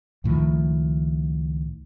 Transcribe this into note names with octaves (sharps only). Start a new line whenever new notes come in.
C#2 A2 D#3 F3